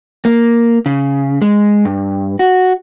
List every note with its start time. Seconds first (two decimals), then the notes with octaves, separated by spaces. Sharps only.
0.25 A#3
0.86 C#3
1.42 G#3
1.85 G2
2.39 F#4